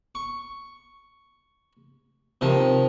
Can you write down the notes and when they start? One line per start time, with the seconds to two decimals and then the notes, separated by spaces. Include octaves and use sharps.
0.15 C#6
2.41 C3 D#3 F3